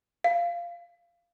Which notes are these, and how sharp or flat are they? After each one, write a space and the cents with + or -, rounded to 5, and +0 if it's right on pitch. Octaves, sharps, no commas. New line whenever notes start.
F5 -15